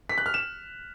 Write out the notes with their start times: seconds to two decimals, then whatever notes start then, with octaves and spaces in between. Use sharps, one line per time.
0.09 B6
0.18 F#6
0.26 F6
0.34 E7